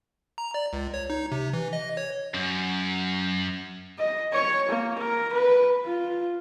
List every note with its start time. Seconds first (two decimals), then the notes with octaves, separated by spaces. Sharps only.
0.38 A#5
0.54 D5
0.73 C#2
0.94 C#5
1.10 D#4
1.32 C3
1.53 E3
1.73 D#5
1.97 C#5
2.34 F#2
3.98 D#5
4.33 C#5
4.69 A#3
4.99 A#4
5.33 B4
5.85 F4